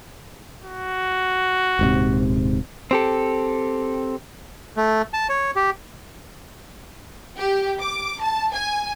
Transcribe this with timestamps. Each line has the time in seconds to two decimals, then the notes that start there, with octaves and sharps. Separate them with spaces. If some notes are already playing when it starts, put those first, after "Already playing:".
0.64 F#4
1.79 D#1 G#2 C3
2.91 C4 G4 A4
4.77 A3
5.13 A5
5.29 C#5
5.56 G4
7.37 G4
7.80 D6
8.22 A5
8.54 G#5